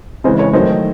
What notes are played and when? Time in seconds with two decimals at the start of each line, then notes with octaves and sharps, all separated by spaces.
0.24 C#3 E3 G#3 C5 D#5
0.39 C#5
0.53 D#3 F#3 A3 C5 D#5